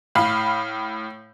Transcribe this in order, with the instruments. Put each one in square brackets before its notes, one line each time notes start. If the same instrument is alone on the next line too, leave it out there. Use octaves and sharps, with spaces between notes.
[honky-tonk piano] A2 F5 B5